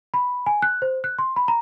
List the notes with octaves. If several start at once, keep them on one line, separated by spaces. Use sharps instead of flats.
B5
G#5
F#6
C5
F#6
C6
B5
A#5